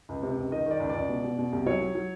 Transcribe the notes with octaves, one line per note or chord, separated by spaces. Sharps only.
C#2
C3
C#2
D#3 D#5
D#3 D5
C#2
D5
C#2
B2
B2
B2
C2
F#3 C#5
F#3
F#3